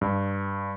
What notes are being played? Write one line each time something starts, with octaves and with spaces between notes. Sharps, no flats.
G2